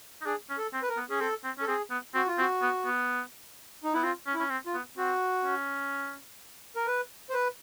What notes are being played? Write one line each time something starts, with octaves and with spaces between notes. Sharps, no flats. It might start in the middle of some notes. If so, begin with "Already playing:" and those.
D#4
D4 G#4
C#4
A4
C4
B4
A#4
B3
C#4 G#4
C4 A4
C4
C#4 A4
C4 G#4
B3
C4 F#4
F4
C4 F#4
B3
B3
D#4
B3 E4
C4 F4
C#4
E4
C#4
C4
F4
B3
C4 F#4
C#4
A#4
B4
C5
B4